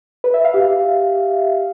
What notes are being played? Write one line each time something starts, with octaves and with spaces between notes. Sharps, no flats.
B4
E5
F5
G4